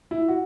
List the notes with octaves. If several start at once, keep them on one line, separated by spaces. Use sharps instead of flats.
E4
F#4